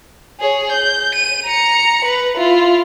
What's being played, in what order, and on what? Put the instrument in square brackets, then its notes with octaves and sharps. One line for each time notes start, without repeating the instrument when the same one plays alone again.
[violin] G#4 C#5
G6
D#7
A#5 C#7
B4
E4 F4